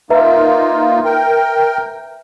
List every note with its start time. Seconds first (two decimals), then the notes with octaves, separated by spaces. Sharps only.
0.10 A#3 D#4 F4 B4 E5 A#5
1.04 A#4 G5